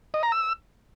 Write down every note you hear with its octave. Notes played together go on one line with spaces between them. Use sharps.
D#5
A#5
E6